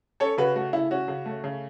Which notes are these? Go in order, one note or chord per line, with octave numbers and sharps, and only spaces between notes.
C#4 A4 C#5
C#3 F#4 B4
A3 F#4
C#3 E4
C#4 F#4
C#3
A3
C#3